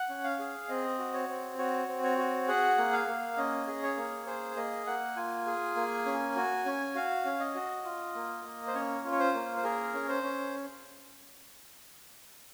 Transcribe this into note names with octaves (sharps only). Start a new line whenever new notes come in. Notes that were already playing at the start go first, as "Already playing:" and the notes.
Already playing: F#5
C#4
F5
G#4
C4 D#5
F#4
C#5
C4
F#4 C#5
C4
C#5
F#4
G#4 F#5
A#3
F5
A#3
C#4 D#5
G#4
C#5
A#3
G#4 C5
A#3 D#5
A#3 F#5
F4 G#5
G#4
A#3
C#4
F#4
C#4
F#4 F5
C#4
D#5
F#4
F4
A#3
A#3
C5
C#4 C#5
F4
C#5
C5
A#3
C5
G#4 A#4
C#4
C5
C#4